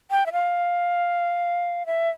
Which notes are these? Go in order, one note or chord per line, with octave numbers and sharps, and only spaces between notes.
G5
E5
F5
E5